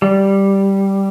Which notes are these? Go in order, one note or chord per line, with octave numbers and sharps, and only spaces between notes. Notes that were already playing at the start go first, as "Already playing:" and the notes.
G3